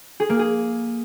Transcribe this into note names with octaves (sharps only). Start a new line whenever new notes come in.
G#4
A#3
G#4